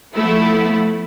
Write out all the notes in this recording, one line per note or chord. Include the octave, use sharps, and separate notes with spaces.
F3 A3 B3 E4